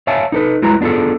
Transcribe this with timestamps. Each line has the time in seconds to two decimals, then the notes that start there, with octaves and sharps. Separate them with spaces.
0.07 C#5 E5 F5 G#5 A5
0.32 D#4 A4 B4
0.62 F#3 G#3 E4 F4 B4 A#5
0.81 B3 D4 F4 G#4 A4